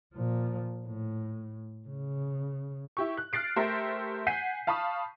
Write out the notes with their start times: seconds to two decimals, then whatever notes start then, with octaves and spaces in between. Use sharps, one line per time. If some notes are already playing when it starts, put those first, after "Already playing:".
0.14 A#2 F3
0.86 A2
1.88 C#3
2.97 E4 G4 C#6
3.17 F#6
3.33 F6 F#6 A6 C7 D7
3.56 A3 G4 A#4 C5 E5
4.27 F#5 G#5 G6 B6 C7 D#7
4.67 F5 A5 B5 C#6 D#6